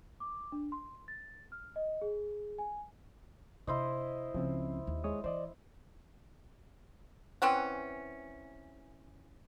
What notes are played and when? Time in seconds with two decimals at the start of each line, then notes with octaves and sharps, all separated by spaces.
0.20 D6
0.52 D4
0.72 C6
1.08 A6
1.52 F6
1.76 D#5
2.02 G#4
2.58 G#5
3.67 C3 E4 C5 D#5
4.34 C#2 C#3 F3 C4 C#4
4.87 D#2
5.04 G#3 C#5 D#6
5.24 E3 C5 D5 D#5
7.42 E3 C4 C#4 F#5